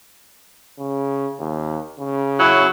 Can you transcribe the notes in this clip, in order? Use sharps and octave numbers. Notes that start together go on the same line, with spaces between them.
C#3
D#2
C#3
F#3 C#4 E4